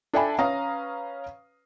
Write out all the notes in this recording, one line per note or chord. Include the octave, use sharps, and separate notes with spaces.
D4 A4 E5 G5 G#5 B5
C#4 B4 F5 A#5 D#6